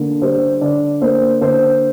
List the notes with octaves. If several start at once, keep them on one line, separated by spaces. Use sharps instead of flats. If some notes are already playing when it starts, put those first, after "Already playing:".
Already playing: D3 A#3
G3 C5
D3 D5
A#3 C5
D3 C5